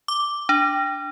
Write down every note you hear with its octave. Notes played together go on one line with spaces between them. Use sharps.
D6
D4